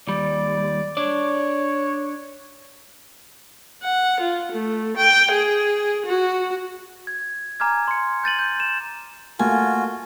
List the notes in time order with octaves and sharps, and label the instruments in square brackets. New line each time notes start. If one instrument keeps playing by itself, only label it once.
[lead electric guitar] D#2 G3 [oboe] D5
[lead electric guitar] D4 D5 [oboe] C#5
[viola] F#5
F4
A3
G5
G#4
F#4
[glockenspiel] G#6
G#5 A#5 D6 F6 G#6
C6 C#7
G6 A6 D#7 F#7
G6
E7
[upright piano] A3 A#3 A#4 [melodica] F4 F#4 [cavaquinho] G#5